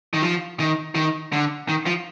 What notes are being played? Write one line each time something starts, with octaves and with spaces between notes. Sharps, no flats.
D#3
F3
D#3
D#3
D3
D#3
F3